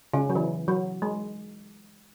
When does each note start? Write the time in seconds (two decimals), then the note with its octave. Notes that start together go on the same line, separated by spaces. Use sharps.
0.13 C#3
0.30 F#3
0.35 E3
0.68 F#3
1.02 G#3